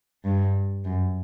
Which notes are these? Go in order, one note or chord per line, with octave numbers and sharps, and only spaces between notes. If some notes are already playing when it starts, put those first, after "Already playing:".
G2
F#2